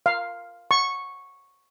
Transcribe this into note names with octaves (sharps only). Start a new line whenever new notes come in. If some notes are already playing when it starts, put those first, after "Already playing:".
F5
C#6